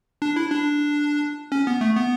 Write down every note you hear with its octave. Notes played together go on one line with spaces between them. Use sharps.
D4
E4
D4
C#4
B3
A3
B3